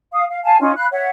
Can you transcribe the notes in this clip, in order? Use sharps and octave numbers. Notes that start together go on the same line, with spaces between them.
F5 D#6
F5
F5 G#5 A5
C#4 D#4 F4
F5 B5 F#6
C#5 E5 F#5